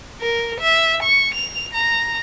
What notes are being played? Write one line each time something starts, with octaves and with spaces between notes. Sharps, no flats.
A#4
E5
C#6
F7
A#5